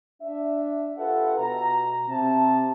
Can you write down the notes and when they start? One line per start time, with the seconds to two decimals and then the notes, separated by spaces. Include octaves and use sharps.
0.22 D4 E5
0.98 F4 G4 A4 B4 E5 F#5
1.39 B2 A#5
2.09 C3 C4 A5